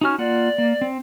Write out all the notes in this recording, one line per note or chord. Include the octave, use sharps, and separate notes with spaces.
C#4 D#4 F#4 F6
A#3 F4 D5 F#5
A#3
C4